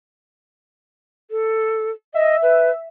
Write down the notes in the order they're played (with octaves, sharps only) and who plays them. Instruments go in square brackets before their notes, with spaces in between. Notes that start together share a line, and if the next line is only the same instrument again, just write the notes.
[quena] A4
[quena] D#5 [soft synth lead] E5
[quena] B4